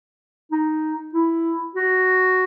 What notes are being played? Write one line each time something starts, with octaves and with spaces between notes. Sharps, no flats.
D#4
E4
F#4